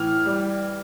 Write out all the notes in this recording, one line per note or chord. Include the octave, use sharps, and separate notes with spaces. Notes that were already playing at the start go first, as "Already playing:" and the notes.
Already playing: A2 E3 F6
G3